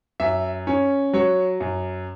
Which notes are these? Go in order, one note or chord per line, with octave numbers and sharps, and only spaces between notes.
F#2 E5
C#4
F#3 C#5
F#2